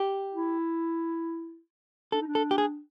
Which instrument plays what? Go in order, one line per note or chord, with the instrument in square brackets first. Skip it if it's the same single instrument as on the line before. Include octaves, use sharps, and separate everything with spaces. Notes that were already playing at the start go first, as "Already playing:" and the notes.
Already playing: [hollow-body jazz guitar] G4
[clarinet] E4
[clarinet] D4 [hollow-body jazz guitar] A4
[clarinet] D#4
D4
[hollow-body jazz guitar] A4
G4
G#4